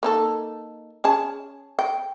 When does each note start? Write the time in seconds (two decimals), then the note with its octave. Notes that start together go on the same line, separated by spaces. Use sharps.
0.03 A#3 D#4 A4
1.04 C#4 G#4 A5
1.79 G5